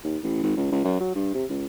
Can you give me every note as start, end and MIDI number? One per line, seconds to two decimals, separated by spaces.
0.04 0.18 39
0.23 0.40 33
0.43 0.53 32
0.57 0.71 37
0.72 0.84 37
0.85 0.99 42
1.00 1.13 54
1.15 1.33 43
1.34 1.45 48
1.50 1.66 37